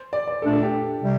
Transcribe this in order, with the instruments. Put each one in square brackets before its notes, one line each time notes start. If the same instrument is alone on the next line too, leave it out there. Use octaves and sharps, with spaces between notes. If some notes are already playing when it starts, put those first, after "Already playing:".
Already playing: [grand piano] C5
D5
D5
[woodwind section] A#2 A3 D4 [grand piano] A4
[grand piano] A4
G4
[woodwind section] C3 G3